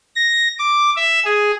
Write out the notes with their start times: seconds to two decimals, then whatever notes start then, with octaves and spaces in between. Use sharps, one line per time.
0.16 A#6
0.59 D6
0.96 E5
1.25 G#4